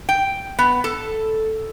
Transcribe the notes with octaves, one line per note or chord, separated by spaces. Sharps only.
G5
B3
A4